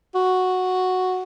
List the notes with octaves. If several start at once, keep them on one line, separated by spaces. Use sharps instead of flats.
F#4